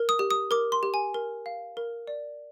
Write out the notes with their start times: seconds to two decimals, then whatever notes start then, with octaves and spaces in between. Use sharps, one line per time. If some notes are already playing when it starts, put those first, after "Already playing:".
Already playing: A#4
0.09 D#6
0.19 G4
0.31 D#6
0.51 A#4 D6
0.72 C6
0.83 G4
0.94 G#5
1.14 A#4
1.46 F5
1.77 A#4
2.07 D5